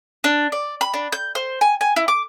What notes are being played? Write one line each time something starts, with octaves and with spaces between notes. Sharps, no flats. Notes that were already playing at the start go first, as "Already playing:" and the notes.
D4
D5
B5
D4
G6
C5
G#5
G#5
E4
D6